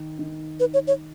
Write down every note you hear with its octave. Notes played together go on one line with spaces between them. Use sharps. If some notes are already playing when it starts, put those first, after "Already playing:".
Already playing: D#3
D#3
B4
C#5
C#5